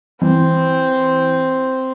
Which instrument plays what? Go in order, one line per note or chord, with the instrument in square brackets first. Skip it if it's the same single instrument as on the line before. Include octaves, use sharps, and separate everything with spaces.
[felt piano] E3 [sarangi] C4